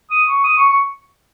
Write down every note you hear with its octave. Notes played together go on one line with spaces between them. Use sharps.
D#6
C#6
D#6
C#6
C#6